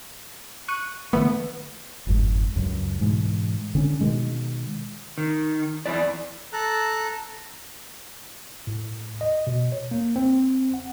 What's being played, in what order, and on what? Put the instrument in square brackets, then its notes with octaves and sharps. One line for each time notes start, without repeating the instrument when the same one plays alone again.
[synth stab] C#6 F#6 D#7
[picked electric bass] D3 E3 A3 [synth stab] B3
[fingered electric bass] G1 F2 G#2
C#2 F#2
G#2 B2 E3 G#3
D3 C4 C#4
B2 D#3 G#3
[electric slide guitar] D#3
E2 E4 D5
[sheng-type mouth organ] A4 A5 A#5 F#6
[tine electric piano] A2
D#5
B2
C#5
A#3
C4
F#5